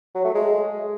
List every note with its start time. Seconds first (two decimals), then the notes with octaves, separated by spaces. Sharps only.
0.15 F#3
0.25 A3
0.34 G#3